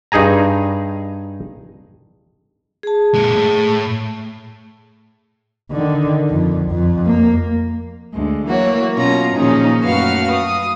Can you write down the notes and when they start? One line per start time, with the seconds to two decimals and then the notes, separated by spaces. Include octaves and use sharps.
0.12 G2 D#4 G#4 G#5 A#5
2.83 G#4 A5
3.15 A#2 G#3
3.36 A2
5.71 D3 D#3
6.30 F2
6.71 F2
7.06 A#3
8.13 D2 G#3
8.47 E3 F#3 A#3 F#4 C#5
8.96 B2 C#4 F4 A#5
9.35 A#2 D#3 F3 C#4 D#4 G#4
9.82 F#2 A3 F#4 B4 F5 F6
10.31 D#6